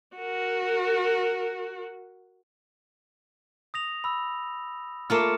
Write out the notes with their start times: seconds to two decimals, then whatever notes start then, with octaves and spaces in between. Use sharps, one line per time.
0.17 F#4 A#4
3.74 D#6 A#6 F7
4.04 B5 E6
5.10 A3 A#3 F4 F6 C#7 E7